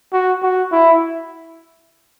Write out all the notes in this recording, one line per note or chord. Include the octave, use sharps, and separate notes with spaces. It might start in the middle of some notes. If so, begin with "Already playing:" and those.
F#4
F#4
E4